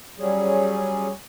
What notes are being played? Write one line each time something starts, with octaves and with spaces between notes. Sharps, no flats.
F#3 G3 C#4 G#4